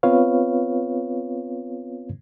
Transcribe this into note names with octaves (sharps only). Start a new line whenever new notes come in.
B3 C4 F4 B4 C#5 F5